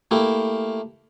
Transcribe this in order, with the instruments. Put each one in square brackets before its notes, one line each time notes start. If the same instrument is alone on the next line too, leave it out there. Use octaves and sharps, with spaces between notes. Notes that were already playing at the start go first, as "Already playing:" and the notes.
[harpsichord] A3 A#3 E4 G4